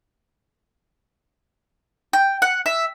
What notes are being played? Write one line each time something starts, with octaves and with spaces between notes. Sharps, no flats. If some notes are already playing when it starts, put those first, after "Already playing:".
G5
F#5
E5